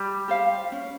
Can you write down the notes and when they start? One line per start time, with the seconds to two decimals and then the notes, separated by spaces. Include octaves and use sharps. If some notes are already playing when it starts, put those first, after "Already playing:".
Already playing: G3
0.28 G4 C5 F5
0.72 C#4